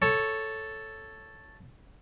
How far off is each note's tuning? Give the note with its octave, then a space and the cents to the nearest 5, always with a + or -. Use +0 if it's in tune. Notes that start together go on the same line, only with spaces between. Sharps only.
A4 +0 C#5 +0